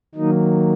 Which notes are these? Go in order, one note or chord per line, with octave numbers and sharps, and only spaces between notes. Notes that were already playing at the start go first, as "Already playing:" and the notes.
D#3 F#3 A#3 D#4